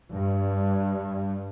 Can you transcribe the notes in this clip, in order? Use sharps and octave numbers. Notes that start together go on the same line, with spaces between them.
G2